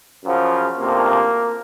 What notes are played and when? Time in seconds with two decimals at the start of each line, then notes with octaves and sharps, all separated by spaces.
0.24 F#2 C#3 F3
0.78 D2 C3 F3 A#3